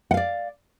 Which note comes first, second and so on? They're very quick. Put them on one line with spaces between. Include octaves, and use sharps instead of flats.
F#5 F5 D5